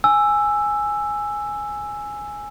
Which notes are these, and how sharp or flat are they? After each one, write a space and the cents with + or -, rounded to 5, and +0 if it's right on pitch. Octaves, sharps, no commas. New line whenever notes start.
G#5 +0 E6 +5